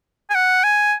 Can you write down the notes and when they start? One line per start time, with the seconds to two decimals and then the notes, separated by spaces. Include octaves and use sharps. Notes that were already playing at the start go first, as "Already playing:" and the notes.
0.30 G#5
0.35 F#5
0.64 G#5